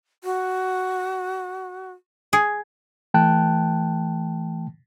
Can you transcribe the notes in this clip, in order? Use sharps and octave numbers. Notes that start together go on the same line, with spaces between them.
F#4
G#4
E3 A3 G5 A5 F#6